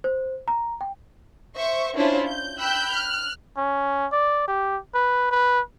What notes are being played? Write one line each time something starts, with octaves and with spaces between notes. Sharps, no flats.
C5
A#5
G5
C5 E5 C#6
C#4 D4 E4 F4 C5 C#5
G6
G5 B5 E6 F#6 G6
F6 F#6
C#4
D5
G4
B4
B4